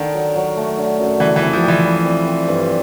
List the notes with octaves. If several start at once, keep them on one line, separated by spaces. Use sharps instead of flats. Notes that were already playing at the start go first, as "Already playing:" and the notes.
Already playing: D3 D#3
F#3
F#3
A3
D3
F#2
E3 G3
E3
C4
F3
C4
E3
G3
C4
C4
G2